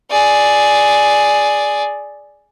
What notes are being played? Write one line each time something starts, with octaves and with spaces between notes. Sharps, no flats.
G#4 D5